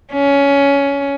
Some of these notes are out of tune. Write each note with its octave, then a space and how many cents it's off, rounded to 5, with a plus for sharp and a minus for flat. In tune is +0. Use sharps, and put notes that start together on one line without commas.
C#4 +15